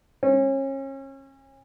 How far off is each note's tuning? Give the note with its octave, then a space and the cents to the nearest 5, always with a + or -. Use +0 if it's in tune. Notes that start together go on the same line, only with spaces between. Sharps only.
C#4 -35